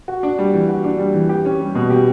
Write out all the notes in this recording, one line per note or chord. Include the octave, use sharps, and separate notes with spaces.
F#4
D4
G3
E3
F#4
D4
G3
E3
G4
C#4
G3
B2
G4